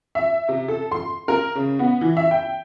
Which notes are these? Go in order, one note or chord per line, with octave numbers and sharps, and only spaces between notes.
E5
C3
A4
C6
A#4
C#3
B3
E3
E5
G5